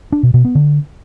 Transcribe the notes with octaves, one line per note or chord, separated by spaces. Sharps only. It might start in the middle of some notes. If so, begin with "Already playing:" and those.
D4
B2
B2
B3
D3